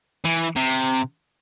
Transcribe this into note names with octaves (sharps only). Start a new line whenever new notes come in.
E3
C3